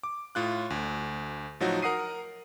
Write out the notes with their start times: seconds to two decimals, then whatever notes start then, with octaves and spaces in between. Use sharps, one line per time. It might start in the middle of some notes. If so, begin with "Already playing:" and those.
0.03 D6
0.35 A2 F4 F#6
0.70 D2
1.60 A2 F3 F#3 D#4 F#4
1.82 A#4 F#5 D#6 C7 D#7